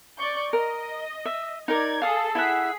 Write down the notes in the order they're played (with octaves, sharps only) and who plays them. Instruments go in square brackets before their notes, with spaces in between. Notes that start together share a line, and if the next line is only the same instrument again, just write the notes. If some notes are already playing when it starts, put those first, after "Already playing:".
[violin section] D5 C#6 G6
[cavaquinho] A#4 [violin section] D#5
[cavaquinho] E5
[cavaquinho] D#4 A#4 [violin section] D5 G#6
[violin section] G#4 A4 [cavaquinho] F5 D#6
[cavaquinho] E4 E5 F#5 [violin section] G#4 B6